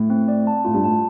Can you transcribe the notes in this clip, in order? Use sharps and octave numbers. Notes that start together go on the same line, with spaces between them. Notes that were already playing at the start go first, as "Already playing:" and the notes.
Already playing: A2
C4
D5
A5
A2 F4
G2
A2 A5